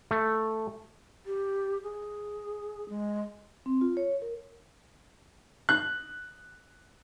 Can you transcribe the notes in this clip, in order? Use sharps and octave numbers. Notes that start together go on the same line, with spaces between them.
A3
G4
G#4
G#3
C4
F4
C#5
A#4
F#6